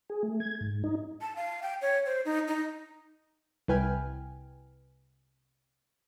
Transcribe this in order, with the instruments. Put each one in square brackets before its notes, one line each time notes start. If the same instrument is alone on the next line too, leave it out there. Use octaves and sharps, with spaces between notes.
[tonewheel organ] G#4
A3
G#6
G#2
D#4
[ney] A5
F5
G5
C#5
C5
D#4
D#4
[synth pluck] C2 E4 B4 G5 G#5 F6